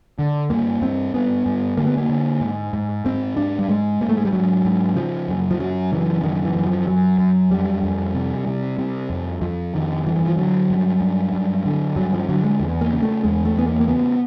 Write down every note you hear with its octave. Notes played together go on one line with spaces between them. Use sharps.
D3
G2 A#3
G2 C4
G2 B3
G2
D3 A#3
B3
A#3
D3
G#2
G#2
G#2 C4
G#2 D4
G3
G#2 G#3
G#2 A#3
A3
G#3
G3
G#2 F#3
G#2
C#3 F3
F#2
F3
F#2 F#3
C#3 E3
F#2 D#3
E3
F#2
F3
F#2 F#3
F#2
F2 G3
F2
C3
C3
C3
F2
F2 F3
F2 D#3
G2 E3
F3
D3 F#3
G2
G2
G2
D3
G2 F#3
F3
D3 F#3
G#3
E2
A#3
C#3
A3
E2 G#3
A3
E2 B3
A#3
A#3
C#3 B3